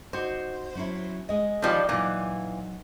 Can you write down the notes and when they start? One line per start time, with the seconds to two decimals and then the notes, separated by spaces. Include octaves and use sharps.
0.13 D#4 F#4 C5
0.75 F#3 C#4 E4
1.29 G#3 D#5
1.62 D#3 F3 G3
1.89 A#2 E3 F#3 D#4